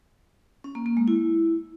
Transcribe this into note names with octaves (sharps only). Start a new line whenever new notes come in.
C#4
A#3
A#3
G#3
E4